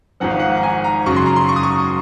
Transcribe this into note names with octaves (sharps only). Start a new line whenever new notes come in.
G#1 G#2 F3 F#5
F5
F#5
A#5
G#5
A#5
F#2 C#3 F#3 C#6
C6
A#5
C6
C#6
D#6
C#6